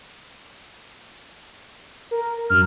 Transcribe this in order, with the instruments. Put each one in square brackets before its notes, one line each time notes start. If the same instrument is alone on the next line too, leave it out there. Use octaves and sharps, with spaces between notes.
[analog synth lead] A#4
[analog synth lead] F#2 [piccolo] F6